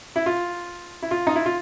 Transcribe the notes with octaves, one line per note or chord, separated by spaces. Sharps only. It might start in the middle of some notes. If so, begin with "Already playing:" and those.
E4
F4
E4
F4
D#4
E4
F4